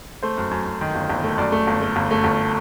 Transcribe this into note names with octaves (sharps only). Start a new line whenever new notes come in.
A3 C5
F#2
F#2
F#2
D#3
G1
G1
A3
F#2 D5
A3
G1
A3
G1
A3
G1